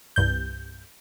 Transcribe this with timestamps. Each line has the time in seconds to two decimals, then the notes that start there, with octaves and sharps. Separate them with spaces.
0.16 C2 G2 G6